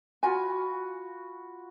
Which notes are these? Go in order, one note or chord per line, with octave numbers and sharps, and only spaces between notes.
F4 F#4 G#5 B5